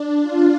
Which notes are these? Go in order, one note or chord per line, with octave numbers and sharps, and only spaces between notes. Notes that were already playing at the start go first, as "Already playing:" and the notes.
Already playing: D4
F4